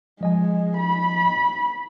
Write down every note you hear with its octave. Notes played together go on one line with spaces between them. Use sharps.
F3 G#3 D#5 G#5
B5